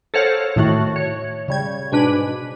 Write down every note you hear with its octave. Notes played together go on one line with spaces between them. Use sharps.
A4 A#4 C5 C#5 F5 F#5
A2 D#3 A3 F#4
C#5
C#3 G3 G#6
G#2 B2 D4 B4 B5